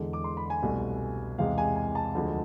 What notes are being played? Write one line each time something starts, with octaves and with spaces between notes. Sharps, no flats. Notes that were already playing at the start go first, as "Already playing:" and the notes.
Already playing: E2 D3 G#3
D6
C6
B5
G#5
C2 B2 A3
E2 C3 G#3 F5
G#5
G#5
A5
D2 D3 F3 G#3